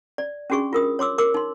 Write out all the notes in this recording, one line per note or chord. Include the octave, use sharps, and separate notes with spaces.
D5
C#4 D4 F#4 G#4 C#6
F4 A#4 D#6
C#5 C6 D6 E6
A#4 D6 E6
D#4 C6